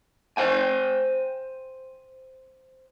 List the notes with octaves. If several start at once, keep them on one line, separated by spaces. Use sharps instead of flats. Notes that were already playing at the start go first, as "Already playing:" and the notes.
C5 G5 G#5